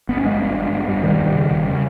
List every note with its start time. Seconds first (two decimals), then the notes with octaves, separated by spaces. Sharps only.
0.09 G1 B3
0.17 C#4
0.25 G1 G#3 B3
0.40 G2
0.57 G1
0.72 G1
0.88 G2
1.03 E1 D#3 G3
1.19 E1
1.35 C#3
1.51 E1
1.67 C#3